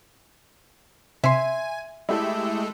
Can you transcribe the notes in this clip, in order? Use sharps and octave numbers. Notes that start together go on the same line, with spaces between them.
C3 E5 G#5 C6
G#3 A3 E4 G4 A4